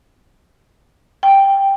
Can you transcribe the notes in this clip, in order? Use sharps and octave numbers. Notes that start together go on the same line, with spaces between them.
G5